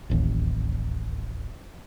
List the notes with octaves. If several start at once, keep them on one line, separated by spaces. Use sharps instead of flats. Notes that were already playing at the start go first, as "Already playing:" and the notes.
D1 A1 D#2